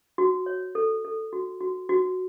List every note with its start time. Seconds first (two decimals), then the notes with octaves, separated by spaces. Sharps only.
0.18 F#4
0.46 C#5
0.75 A4
1.05 A4
1.33 F#4
1.61 F#4
1.89 F#4